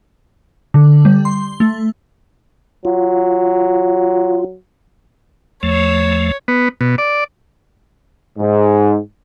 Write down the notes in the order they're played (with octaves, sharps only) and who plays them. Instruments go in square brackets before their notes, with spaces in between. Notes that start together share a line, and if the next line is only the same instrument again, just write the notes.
[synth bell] D3
G3
C6
A3
[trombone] F#3 [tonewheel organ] F4
[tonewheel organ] E2 F3 A3 [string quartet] C#5
[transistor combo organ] B3
B2
D5
[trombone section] G#2